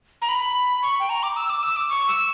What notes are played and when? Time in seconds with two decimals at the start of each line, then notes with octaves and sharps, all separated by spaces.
0.22 A#5
0.29 B5
0.82 C#6
1.00 G5
1.09 A#5
1.23 D6
1.36 E6
1.50 D6
1.63 E6
1.76 D6
1.90 C#6
2.08 E6